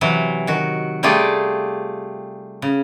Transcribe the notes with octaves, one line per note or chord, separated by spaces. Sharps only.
C3 E3 F#3
D#3 F#4
G3 A3 F4 G4 G#4
C#3